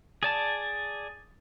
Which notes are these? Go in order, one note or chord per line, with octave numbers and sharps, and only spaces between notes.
G#4 D5 A5